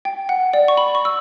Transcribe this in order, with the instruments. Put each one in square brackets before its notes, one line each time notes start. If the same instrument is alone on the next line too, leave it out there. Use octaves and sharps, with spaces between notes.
[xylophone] G5
F#5
D5
C#6
B5
C#6
E6